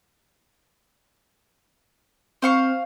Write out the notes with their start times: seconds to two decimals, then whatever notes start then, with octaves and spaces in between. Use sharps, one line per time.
2.42 C4 C5 F5 C#6